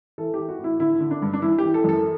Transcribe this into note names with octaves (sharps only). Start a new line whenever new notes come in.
E3 A4
E3 G4
F#4
A2
E4
D3 E4
D3
D4
G2
D4
E3 E4
E3 G4
A4
F#2 A4